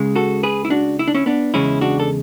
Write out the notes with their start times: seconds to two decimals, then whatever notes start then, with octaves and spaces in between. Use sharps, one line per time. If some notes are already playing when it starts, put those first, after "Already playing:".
Already playing: C#2 C#3 G#3
0.15 F#4 A4
0.43 G#4 B4
0.65 E4
0.70 D4 F#4
0.99 E4
1.08 D4
1.15 C#4 E4
1.26 B3 D4
1.54 E2 C#3 E3 G#3 C#4 E4
1.81 D4 F#4
2.00 A4